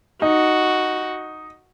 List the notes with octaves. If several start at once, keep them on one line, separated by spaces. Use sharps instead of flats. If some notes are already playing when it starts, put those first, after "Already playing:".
D#4 F#4